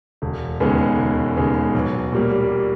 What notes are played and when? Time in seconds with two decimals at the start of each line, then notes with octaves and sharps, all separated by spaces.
0.22 E1
0.60 D#2 C#3 G#3 B3
0.98 E1
1.36 D#2 C#3 G#3 B3
1.75 B1
2.12 A#2 G3 A#3